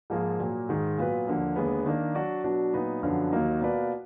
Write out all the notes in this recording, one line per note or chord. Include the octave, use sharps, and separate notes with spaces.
G#2 F3 A#3 F4 G#4
A#2 F#3 A#3
G#2 D#3 G#3
A#2 F#3 B3 F4 B4
D#2 D3 F3 A#3
D#2 D3 G#3 B3
D#3 A#3 D4
F#3 D4 F#4 D5
B2 F#3 D4 F#4 B4
A#2 F#3 B3 D#4
F#2 D3 F3 B3 D4
D#2 D#3 F#3 A#3 D#4
B2 A#3 F4 B4 D5